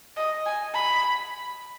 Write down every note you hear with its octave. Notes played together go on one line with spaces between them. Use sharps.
D#5
G#5
B5